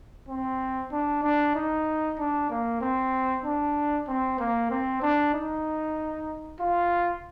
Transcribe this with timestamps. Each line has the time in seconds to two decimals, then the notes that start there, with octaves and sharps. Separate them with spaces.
0.29 C4
0.92 D4
1.23 D4
1.56 D#4
2.19 D4
2.50 A#3
2.81 C4
3.44 D4
4.08 C4
4.39 A#3
4.71 C4
5.02 D4
5.34 D#4
6.60 F4